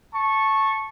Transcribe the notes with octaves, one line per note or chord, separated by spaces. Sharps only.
A5 C#6